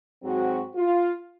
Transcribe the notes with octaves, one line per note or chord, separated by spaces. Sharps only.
G#2 F#3 C4 F#4
F4